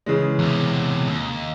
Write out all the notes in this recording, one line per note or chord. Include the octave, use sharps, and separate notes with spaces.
C#3 E3 G#3
E2 C3
D#2